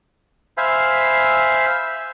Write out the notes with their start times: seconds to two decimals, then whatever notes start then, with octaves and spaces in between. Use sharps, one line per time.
0.57 C5 E5 F5 G#5 B5